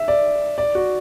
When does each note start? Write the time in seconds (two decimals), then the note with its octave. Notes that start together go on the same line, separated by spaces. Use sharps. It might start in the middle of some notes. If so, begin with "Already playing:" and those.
Already playing: E5
0.08 D5
0.58 D5
0.75 F#4